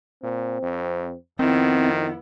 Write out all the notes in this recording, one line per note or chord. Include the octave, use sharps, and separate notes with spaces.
A#2 C4
F2
F2 D#3 B3 C4 E4